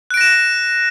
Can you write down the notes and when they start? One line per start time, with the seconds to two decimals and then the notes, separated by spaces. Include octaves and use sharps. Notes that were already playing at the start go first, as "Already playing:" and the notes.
0.10 F#6
0.14 D7
0.17 A#6
0.21 E7